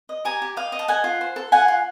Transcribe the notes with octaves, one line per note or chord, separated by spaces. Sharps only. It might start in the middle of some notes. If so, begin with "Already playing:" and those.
D#5
G4 G#5 A#5
G4
D#5 F5 G5
D#5
A5
A4 F#5 G#5
F4
C5
A4
F4 F#5 G#5
F4